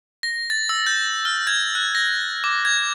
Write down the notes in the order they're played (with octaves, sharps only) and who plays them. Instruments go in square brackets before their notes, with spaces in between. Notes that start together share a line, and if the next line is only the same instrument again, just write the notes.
[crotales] A#6
A6
E6
G6
F6
G#6
F#6
A#6
D6
G#6